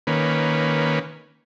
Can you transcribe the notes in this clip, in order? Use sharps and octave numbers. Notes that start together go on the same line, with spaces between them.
D#3 A#3 C#4 B4